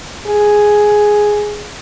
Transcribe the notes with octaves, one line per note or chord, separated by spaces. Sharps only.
G#4